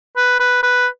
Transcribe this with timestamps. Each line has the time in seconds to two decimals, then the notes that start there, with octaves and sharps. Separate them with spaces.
0.17 B4
0.40 B4
0.63 B4